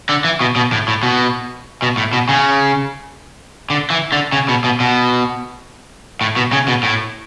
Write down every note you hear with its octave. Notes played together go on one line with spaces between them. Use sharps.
D3
E3
B2
B2
A2
A2
B2
B2
A2
B2
C#3
D3
E3
D3
C#3
B2
B2
B2
A2
B2
C#3
B2
A2